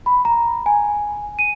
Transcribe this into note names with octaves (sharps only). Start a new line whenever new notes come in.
B5
A#5
G#5
D#7